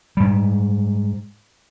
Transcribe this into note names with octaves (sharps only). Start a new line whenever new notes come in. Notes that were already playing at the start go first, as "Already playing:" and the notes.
G#2 G3